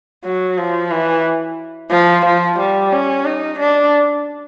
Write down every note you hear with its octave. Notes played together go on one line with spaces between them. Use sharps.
F#3
F3
E3
F3
F3
G3
C#4
D#4
D4